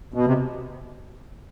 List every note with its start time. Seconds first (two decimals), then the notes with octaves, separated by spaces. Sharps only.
0.14 B2
0.27 C3